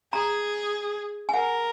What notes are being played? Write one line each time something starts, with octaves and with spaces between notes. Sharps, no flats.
G#4 A#5
G#5
A#4 F#5